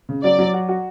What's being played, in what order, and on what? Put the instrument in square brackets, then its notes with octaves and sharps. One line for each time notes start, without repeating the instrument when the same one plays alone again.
[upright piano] C#3
[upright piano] F#3 [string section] D5
[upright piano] F#3
F#4
F#4